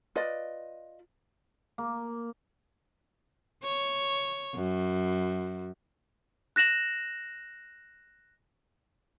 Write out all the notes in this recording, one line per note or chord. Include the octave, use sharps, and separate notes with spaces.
F4 B4 D5 D#5
A#3
C#5
F#2
F#6 A#6 E7 F#7